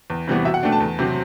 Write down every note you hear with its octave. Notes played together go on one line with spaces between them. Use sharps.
E2
C3 E3 G3 B3
B2 E5
F#5
A3 D4 G5
A5
E2
C3 F#3 C4